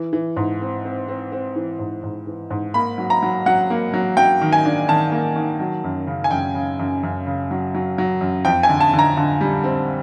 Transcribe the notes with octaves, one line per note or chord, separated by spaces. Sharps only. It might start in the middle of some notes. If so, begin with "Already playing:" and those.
Already playing: E3
E3
G#2
C4
C4
C4
C4
E3
G#2
G#2
E3
G#2
A#3 B5
F#3
A#5
F#3
F#3 F#5
A#3
F#3
F#3 G5
D#3
G#5
D4
D#3 A5
A#3
D#3
F#3
F#2
C#3
G#5
F#2 G5
C#3
F#2
F#2
C#3
F#3
F#3
F#3
F#2
F2 G5
G#5
D3
A5
D3
A#5
D3
G3
C4